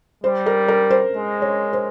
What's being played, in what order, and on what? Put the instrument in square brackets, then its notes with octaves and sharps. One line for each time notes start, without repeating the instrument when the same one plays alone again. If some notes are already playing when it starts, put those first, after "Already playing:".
[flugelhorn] G3 [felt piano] C5
[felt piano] A#4
A#4
C5
[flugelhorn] G#3
[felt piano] C#5
C5